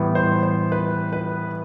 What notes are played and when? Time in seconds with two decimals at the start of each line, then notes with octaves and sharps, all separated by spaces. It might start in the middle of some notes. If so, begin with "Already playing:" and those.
Already playing: A2 E3 G3 B3
0.15 C5
0.43 C5
0.72 B4
1.13 B4